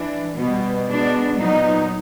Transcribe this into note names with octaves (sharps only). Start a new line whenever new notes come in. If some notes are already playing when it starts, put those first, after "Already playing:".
Already playing: E3 D4
B2 G3 B3
B2 G#3 B3 D4
A#2 F#3 B3 D#4